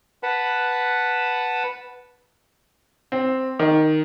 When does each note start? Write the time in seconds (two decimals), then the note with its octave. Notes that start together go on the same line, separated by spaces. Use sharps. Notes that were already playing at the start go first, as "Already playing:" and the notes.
0.23 B4 F#5 A5 B5
3.12 C4
3.59 D#3